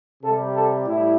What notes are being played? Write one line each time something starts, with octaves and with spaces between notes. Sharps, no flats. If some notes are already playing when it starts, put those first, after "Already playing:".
C3 G3 A4
A4
A2 G3 E4